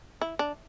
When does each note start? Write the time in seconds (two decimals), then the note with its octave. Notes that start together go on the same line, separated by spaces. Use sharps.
0.21 E4
0.39 D4